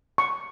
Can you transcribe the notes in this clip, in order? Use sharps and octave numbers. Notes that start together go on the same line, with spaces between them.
C#6